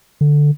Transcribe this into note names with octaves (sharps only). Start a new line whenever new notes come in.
D3